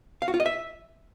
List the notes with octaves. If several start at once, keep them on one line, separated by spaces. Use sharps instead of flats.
F5
F#4
F4
D#5
E5